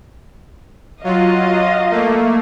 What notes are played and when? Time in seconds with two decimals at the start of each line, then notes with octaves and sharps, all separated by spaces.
1.04 F#3 F4 D#5 F5
1.91 A3 A#3